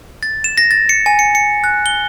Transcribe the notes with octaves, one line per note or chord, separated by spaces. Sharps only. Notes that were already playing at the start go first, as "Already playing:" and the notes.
A6
E7
A#6
A6
C#7
G#5
C#7
C#7
F#6
G7